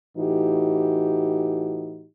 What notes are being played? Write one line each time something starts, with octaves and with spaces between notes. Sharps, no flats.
A2 E3 D#4 F#4 G4